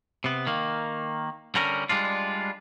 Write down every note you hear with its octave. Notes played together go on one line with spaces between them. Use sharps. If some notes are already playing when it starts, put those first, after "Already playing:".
C3 B3
D#3 A#3
D3 G3 C#4 A#4
G3 G#3 D4 F4